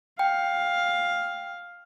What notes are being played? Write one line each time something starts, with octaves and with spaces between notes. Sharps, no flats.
F5 G5